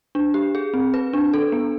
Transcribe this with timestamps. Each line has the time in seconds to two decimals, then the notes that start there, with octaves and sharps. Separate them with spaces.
0.15 D4
0.34 G4
0.55 G#4
0.74 C4
0.94 B4
1.13 D4
1.34 A4
1.52 B3